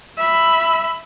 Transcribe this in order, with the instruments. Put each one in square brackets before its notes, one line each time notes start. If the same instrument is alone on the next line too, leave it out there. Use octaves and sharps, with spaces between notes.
[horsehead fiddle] E5 B5